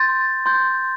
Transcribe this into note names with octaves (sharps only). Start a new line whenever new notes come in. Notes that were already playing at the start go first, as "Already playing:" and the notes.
Already playing: C6 G6 A6
C6 G6